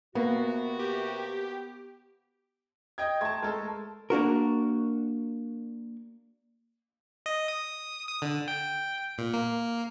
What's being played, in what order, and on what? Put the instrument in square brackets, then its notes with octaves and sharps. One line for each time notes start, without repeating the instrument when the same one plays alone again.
[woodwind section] C3 F#4 [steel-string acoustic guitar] A#3 [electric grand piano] B3
[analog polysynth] G4
[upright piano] D#5 G5 G#6
[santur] A3 C5 A#5 [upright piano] A5 G#6
[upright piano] G#3 A4 [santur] A#4 A5
[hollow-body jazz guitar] A#3 D4 F#4 A#4
[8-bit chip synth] D#5
D#6
D#6
D3
G5
A#2
A#3